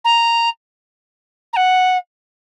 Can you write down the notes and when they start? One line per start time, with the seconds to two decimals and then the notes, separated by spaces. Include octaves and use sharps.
0.04 A#5
1.53 A#5
1.56 F#5